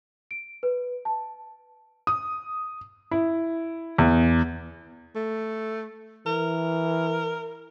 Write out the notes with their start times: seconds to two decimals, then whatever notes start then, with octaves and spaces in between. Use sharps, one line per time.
0.31 D7
0.63 B4
1.05 A5
2.07 D#6
3.11 E4
3.98 E2
5.16 A3
6.27 E3 A#4